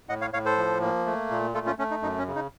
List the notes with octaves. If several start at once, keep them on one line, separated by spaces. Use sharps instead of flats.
A2 D#5 F#5
C#5 F5
A2 C#5 F5
A4 C5
F3
A#3
A3
A#2
A3 F4 A4
C#4 F4
A3 C#4
D#4
F#2 D#4
C#4
C#3
D#4